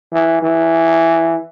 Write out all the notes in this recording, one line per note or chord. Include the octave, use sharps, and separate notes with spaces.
E3
E3